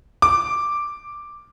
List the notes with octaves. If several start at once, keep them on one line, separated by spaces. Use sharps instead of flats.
D6